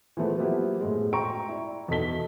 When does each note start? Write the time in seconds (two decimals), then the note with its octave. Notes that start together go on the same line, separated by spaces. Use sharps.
0.17 E3 F3 G#3 A3 B3
0.36 F3 F#3 A#3 B3 E4 G4
0.81 A2 G#3
1.13 G5 A#5 C6 C#6 D7
1.48 E4 D5
1.88 E2 B2 D#4 A4 B6 G7